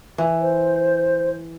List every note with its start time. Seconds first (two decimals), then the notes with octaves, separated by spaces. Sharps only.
0.18 E3
0.41 C5